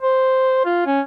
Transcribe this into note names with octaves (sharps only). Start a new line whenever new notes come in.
C5
F4
C#4